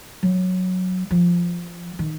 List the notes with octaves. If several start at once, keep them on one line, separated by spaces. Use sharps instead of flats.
F#3
F3
D#3